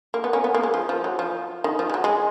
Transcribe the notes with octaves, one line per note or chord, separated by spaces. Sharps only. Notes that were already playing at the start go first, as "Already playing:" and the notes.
A#3
B3
A#3 C#4
B3
A#3
G#3
F3
F3
F#3
F3
D#3
F3
G#3
F#3
G#3